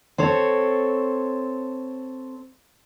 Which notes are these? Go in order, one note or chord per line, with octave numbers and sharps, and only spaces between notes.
C4 A4 C#5